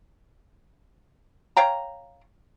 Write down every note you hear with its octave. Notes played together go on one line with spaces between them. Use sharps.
C#5 F5 G5 A#5